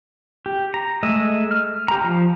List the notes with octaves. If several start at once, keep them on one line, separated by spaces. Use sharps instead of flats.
G4
A#5
G#3 A3 D#5 E5
F6
G4 A#5
F3